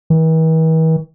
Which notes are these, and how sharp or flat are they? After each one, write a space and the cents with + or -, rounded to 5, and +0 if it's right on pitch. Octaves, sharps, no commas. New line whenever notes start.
E3 -45